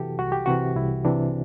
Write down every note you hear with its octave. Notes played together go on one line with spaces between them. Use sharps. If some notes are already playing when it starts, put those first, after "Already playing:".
Already playing: C3 E3 F#4 G4 A4
C2 F#4
G4
C3 E3 F#4
C2 E4
C3 E3 D4